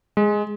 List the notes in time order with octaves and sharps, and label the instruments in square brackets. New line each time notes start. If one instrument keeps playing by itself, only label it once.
[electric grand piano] G#3